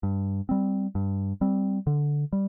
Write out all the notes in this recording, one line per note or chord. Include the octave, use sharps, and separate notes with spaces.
G2
G3 C4
G2
G3 C4
D3
G3